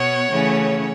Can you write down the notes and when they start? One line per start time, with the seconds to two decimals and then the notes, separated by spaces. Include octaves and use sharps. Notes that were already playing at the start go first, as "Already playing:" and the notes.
Already playing: B2 B3 C#5 F#5
0.31 C#3 E3 A3 C#4